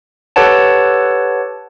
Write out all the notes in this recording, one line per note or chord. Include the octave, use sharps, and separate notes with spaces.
G4 A4 B4 C#5 F#5 A5